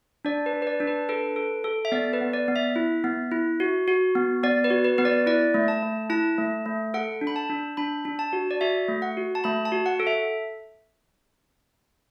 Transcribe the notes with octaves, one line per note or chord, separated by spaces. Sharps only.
D4 D5
B4
D4
B4
D5
D4
B4
A4 B4
A4
A4
E5
B3 D5
B4
B3
D5
B3
E5
E4
B3
E4
F#4
F#4
B3
B3 D5
B4
F#4
B4
B3 B4
D5
E4 D5
A3
A5
A3
E4 A5
A3
A3
A4 F#5
D4
B5
A5
D4
D4 B5
D4
A5
F#4
D5
F#4 E5
A3
F#5
F#4
A5
A3 B5
A5
F#4
F#5
A4
E5